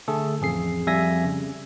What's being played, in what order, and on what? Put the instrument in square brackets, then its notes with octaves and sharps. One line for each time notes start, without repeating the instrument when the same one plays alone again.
[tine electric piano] D3 A3 G#4 A4
A1 F2 G#4 C7
F2 G3 E5 G#5 A#6
C#3